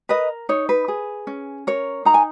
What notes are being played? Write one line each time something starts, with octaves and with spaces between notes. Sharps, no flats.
A#4 B4 D#5
D#4 C#5
B4
G#4
C#4
A#4 C#5
D#4 A#5
G#5